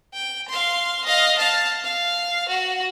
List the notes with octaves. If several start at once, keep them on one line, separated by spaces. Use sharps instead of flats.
G5
F5 C6
D#5 F5
F5 A5
F5
F#4